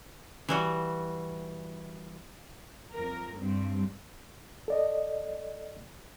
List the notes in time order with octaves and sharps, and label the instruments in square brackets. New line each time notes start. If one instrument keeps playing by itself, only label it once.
[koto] E3 G3 F#4
[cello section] F2 A#4
G2 G3 C4
[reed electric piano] A4 D5 D#5